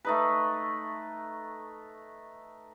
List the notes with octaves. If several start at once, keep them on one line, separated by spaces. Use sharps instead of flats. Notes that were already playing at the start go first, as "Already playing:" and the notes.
A3 D#4 B4